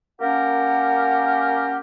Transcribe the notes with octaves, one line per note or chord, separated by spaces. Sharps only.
A#3 C#4 G4 A#4 F#5